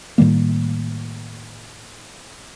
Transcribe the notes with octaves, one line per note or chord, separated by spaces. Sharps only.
A2 D#3 G3 A#3